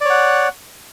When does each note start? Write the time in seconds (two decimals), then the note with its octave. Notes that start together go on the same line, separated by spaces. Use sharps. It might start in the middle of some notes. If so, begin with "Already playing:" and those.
0.01 D5
0.05 C#5
0.10 F#5